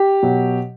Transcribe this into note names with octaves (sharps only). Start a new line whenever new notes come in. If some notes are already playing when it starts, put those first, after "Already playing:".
Already playing: G4
B2 F#3